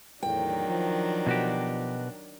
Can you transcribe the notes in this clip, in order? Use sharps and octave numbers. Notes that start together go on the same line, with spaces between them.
E2 A2 D#3 F#3 D4 G5
F3
B2 F#4 G4